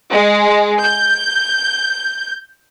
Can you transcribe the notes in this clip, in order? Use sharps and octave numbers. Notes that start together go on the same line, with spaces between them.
G#3
G6